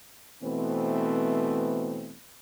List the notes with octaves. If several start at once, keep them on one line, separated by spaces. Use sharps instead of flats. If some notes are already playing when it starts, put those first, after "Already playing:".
B2 E3 A3 B3 C4